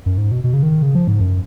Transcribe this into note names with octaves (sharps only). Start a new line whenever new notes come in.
F#2
G#2
B2
B2
C#3
D#3
C#3
F3
G#2
F#2